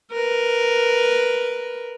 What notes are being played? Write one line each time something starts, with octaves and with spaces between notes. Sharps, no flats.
A#4 B4